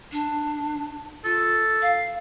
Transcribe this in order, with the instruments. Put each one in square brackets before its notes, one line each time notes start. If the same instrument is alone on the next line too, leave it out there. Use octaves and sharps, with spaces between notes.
[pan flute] D4
[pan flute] F4 [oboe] A4
[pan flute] F5